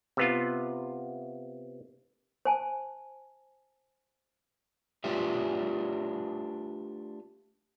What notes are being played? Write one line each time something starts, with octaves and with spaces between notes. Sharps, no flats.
C3 B3 F4
C5 G#5 A5
A3 D4 F4 G4 B4 E5